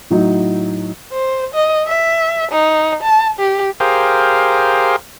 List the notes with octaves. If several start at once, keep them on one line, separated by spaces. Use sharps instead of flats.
A2 F#3 D#4
C5
D#5
E5
D#4
A5
G4
G4 G#4 A#4 C5 F5